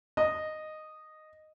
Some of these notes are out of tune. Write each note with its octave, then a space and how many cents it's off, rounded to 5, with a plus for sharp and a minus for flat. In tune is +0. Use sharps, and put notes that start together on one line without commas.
D#5 -10